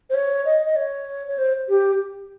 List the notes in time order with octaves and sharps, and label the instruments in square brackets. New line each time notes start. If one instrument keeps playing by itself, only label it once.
[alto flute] C5
C#5
D#5
D#5
C#5
C#5
C5
G4